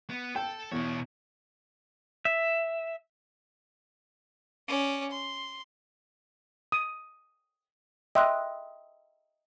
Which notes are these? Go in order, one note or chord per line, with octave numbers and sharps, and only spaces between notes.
B3
A4 G5
E2 B2 C#5
E5
C#4 D5
C6
D#6
D#5 E5 G5 C6 F#6